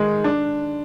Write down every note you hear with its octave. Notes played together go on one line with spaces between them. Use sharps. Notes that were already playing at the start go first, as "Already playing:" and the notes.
Already playing: D#3 G#3
D4